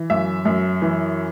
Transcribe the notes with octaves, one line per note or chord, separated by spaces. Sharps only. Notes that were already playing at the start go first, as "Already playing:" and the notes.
Already playing: E3
F#2 E5
F#2
E3